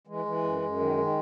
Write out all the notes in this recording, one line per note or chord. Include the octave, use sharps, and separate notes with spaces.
E3 G#3
E3
F#2
F#2
D#3
D#3